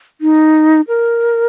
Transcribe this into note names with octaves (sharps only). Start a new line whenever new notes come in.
D#4
A#4